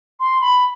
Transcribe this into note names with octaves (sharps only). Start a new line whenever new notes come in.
C6
B5